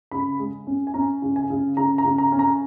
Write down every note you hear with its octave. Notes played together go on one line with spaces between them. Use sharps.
C#3 B5
G#3
C#4
G#5
C#4 A#5
C#3
G#5
C#3
C#3 A#5
A#5
C#3
A#5
C#4
A#5